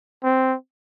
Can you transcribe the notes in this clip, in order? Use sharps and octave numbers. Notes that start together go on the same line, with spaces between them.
C4